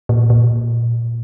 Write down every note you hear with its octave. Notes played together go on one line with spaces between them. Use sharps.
A#2
A#2